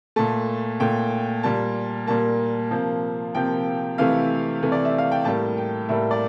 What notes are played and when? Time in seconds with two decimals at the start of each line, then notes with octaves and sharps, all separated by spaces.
0.16 A#2 A3 A5
0.80 A#2 A3 G5
1.43 A#2 G3 A#3 A5
2.07 A#2 G3 A#3 A5
2.71 C3 F3 A#3
3.35 C3 F3 A#3 G5
3.98 C3 E3 A3 F5
4.62 C3 E3 A3
4.72 D5
4.85 E5
4.98 F5
5.11 G5
5.25 A2 G3 A#3 A5
5.57 G5
5.89 A2 G3 A#3 E5
6.11 D5